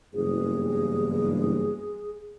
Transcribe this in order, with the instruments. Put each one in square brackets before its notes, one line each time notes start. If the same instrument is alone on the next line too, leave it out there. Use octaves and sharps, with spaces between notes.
[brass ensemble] F#1 E2 G2 [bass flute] G#4